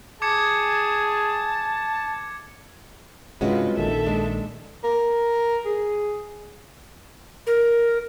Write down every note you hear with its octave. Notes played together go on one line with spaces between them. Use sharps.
G#4 A5 D6 G#6 C#7
G2 C3 G#3 C#4 F4 F#4 B4
A#1 D#3 A4 E5
G#3 D4
A#4
G#4
A#4